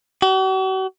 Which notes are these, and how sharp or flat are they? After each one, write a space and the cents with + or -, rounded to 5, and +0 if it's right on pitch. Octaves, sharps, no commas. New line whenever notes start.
F#4 +45